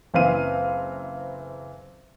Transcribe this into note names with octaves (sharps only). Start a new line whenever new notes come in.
F#1 E3 C4 F5 D#7